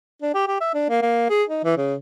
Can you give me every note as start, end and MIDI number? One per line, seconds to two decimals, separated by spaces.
0.22 0.33 62
0.35 0.47 67
0.48 0.59 67
0.61 0.72 76
0.74 0.85 62
0.90 1.01 58
1.02 1.25 58
1.30 1.44 68
1.49 1.64 63
1.64 1.76 52
1.77 1.95 49